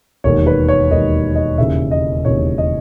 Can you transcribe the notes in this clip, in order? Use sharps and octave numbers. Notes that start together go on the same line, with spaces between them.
E1 D#2 D#3 C#5
B4
C#5
E1 D#2 D#3 D#5
D#5
E1 D#2 C#3 E3 E5
D#5
E1 D#2 C#3 E3 C#5
D#5